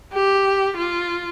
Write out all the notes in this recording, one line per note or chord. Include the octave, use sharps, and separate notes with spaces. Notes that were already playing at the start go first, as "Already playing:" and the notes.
G4
F4